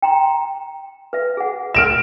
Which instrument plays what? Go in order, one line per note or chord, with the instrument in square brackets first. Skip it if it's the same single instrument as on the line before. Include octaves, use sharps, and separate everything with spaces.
[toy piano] G5 A#5 C6
B4 E5
G#4 F#5
[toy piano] A#4 E5 [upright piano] F6 D7 E7